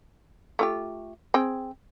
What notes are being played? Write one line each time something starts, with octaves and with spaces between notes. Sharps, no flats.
A3 F4 G4
C4 G#4 G5